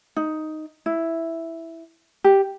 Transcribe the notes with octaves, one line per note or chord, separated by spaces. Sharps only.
D#4
E4
G4